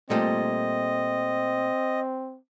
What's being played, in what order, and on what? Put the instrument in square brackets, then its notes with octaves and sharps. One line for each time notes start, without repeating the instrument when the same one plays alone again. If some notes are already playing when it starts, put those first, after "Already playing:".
[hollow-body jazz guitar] A#2 G3 A3 [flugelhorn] C4 [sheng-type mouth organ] D#5